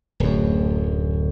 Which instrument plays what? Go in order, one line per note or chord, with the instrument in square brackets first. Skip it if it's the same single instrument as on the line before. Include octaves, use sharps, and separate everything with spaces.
[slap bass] D1 F#2